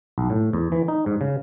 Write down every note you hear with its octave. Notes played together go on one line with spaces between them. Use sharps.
B1
A2
E2
E3
D#4
G#2
C#3